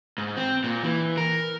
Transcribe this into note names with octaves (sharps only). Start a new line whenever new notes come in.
G#2
C4
A#2
E3
A#4